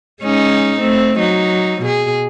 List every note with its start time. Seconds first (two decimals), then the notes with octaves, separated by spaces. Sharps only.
0.22 G#3 C#4 D#4
0.81 A3 C4
1.19 F#3 D#4
1.82 B2 G#4